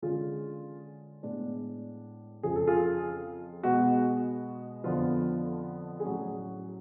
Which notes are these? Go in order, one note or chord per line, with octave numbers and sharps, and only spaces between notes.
D3 G#3 C#4 F4 G#4
A2 G#3 B3 D4
F2 C#3 F3 G#4
A4
F4 G#4
B2 G#3 B3 F#4
F2 D3 F3 B3 F4
G#4
A2 F#3 C#4 F#4